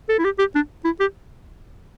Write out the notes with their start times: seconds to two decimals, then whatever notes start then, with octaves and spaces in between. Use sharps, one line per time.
0.09 A4
0.19 E4
0.24 G4
0.39 G4
0.55 D4
0.85 E4
1.00 G4